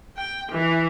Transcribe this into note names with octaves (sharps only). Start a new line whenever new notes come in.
G5
E3